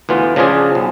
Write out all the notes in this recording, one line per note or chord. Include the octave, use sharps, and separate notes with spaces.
D2 E3 B3 F4
C#3 F3 D4 F4 G#4
B1